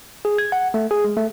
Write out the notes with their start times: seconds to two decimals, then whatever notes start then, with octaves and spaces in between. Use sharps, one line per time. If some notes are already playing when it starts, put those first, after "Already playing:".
0.25 G#4
0.38 G#6
0.52 F#5
0.74 A3
0.91 G#4
1.04 G#3
1.17 A3